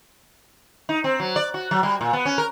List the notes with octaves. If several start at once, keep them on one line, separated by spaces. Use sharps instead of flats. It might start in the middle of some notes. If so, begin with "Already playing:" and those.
D#4
C4
F#3
D5
F#4
F#3
G3
A#2
B3
C#4
A#4